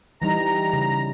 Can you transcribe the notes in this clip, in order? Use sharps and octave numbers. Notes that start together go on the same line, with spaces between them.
E3 G3 D#4 A#5
C#3